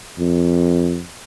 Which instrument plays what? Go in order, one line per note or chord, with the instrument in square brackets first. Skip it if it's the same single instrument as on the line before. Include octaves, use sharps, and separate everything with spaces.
[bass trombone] F2